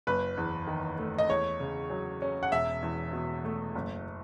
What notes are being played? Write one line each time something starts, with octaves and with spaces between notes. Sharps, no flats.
F#1 B4
E2
D#3
A3
D#5
E2 C#5
C#3
F#3
C#4
F#5
E1 E5
E2
B2
A3
F#1